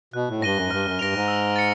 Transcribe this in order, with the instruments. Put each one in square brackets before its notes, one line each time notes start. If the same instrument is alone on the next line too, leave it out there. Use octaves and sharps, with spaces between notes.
[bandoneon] B2 [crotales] F#6
[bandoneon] A2
G#2
[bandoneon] G2 [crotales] A#6 D#7 G7
[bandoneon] F#2
G#2
[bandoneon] G2 [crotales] F6
[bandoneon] F#2
[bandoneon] G2 [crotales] A#6 D7 F7
[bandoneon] G#2
[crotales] E6
A6 C#7